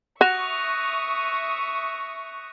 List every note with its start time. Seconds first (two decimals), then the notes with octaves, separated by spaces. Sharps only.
0.21 F#4 E5 C#6 D#6 F#6 A#6 F7